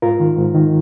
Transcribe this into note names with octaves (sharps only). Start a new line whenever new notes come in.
G#2 F4 A#4
D#3
G#2
D#3